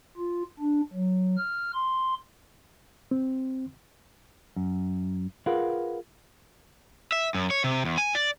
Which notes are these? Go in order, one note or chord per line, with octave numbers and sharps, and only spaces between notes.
F4
D4
F#3
F6
C6
C4
F#2
F4 G#4 A#4 B4 F5 F#5
E5
F#2
C#5
C3
E2
G#5
D5